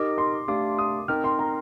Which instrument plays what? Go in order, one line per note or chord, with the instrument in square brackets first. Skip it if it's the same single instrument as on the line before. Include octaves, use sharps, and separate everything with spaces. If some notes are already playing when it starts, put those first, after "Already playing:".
Already playing: [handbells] D#4 G4 A#4 D#5 [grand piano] D6
[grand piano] C6
[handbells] A3 D4 G4 D5 F5 [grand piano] D6
[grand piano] D#6
[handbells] C4 D#4 A#4 D#5 G5 [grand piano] F6
[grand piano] C6
A#5